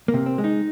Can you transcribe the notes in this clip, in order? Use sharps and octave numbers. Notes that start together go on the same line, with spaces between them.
A#3
C3
C4
G#3
D#4